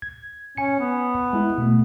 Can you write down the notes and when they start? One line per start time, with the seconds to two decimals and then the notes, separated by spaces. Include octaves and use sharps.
0.02 G#6
0.57 C#4 G#5 C#7
0.80 B3
1.33 G#3 E4
1.58 B2 A3